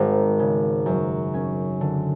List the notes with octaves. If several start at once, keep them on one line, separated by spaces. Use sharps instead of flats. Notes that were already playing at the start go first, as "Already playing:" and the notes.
Already playing: G#1 G#3
C#3
F#2
C#4
D3